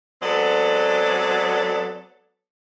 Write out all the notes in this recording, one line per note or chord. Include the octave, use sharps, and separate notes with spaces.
F#3 G#3 B3 C4 A4 D5